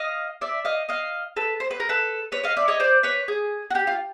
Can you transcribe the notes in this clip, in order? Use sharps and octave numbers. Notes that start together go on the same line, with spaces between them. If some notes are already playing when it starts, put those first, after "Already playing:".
Already playing: D#5 F5
D5 E5
D#5 F5
D#5 F5
A4 B4
C5
B4
A#4
A4 B4
B4 C#5
D#5 F5
D5 E5
C#5 D#5
C5 D5
B4 C#5
G#4
F#4
G4
F4